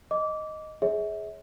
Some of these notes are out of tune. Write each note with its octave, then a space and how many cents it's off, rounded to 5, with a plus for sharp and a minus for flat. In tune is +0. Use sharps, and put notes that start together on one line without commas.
D#5 +0 D6 -20
G#4 +5 C#5 +5 E5 -40